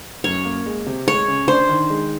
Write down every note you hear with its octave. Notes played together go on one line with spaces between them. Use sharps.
F#2 C#5
A#3
G#3
C3
G#3 C#5
C#3
D4 C5
D#3
G#3